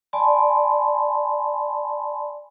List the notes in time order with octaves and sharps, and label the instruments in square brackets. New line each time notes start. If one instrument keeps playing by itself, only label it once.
[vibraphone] D5 G#5 A5 B5 C6